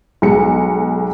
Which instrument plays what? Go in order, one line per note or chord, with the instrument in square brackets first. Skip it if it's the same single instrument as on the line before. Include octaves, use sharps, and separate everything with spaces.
[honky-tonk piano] B1 G#3 C#7